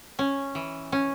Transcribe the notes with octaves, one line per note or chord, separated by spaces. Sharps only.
C#4
E3
C#4